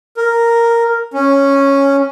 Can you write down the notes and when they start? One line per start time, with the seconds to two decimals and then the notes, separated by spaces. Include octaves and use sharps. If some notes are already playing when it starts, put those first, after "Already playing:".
0.17 A#4
1.13 C#4